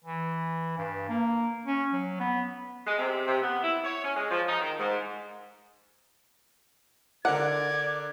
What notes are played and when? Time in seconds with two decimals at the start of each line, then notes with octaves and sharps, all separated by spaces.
0.04 E3
0.78 G2
1.09 A#3
1.66 C#4
1.93 F#3
2.20 B3
2.87 G#3
2.99 C3
3.27 C3
3.42 B3
3.63 E4
3.85 C#5
4.04 C#4
4.17 G#3
4.31 F3
4.48 D#4
4.61 D#3
4.79 G#2
7.25 D3 A#4 D5 F#5 D6 G#6